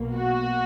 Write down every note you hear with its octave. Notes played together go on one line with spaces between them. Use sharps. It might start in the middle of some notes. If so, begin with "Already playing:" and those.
Already playing: B1 B2 A#3
F#4